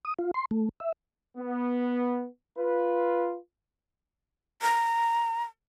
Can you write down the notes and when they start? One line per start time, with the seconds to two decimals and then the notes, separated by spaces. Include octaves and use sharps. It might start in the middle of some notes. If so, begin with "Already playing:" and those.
0.05 D#6
0.19 F4
0.34 C6
0.51 A3
0.80 E5
1.38 B3
2.57 F4 B4
4.62 A#5